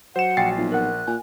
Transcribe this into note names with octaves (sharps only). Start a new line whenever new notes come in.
F#3 C5 F#5 E7
A#1 G5 G#5 A6 C7
B1 F4
A#4 F#5 F#6
A#2 G#5